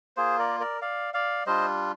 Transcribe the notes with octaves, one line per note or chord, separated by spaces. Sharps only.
A#3 F4 G#4 C5
A#4 D5
A#4 D5
D5 F5
D5 F5
G3 D4 F4 C5 D#5